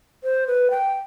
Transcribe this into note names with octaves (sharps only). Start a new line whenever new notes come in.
C5
B4
G5